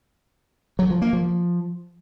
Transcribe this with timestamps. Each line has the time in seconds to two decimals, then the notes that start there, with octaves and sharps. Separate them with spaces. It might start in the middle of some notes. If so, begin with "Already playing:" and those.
0.79 F#3
0.90 F3
1.02 A#3
1.13 F3